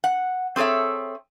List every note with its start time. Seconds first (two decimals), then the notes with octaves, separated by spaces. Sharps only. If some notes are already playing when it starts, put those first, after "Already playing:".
0.04 F#5
0.56 C4 G#4 A4 C#5 E5